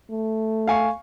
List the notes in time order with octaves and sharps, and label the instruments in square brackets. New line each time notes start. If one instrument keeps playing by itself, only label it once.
[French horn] A3
[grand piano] F5 G#5 C#6